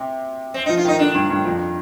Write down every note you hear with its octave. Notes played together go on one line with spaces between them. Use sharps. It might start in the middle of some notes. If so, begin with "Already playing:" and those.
Already playing: C3
C4
D#4
F3
F4
D#3 D#4
D3 D4
G2
G2
F2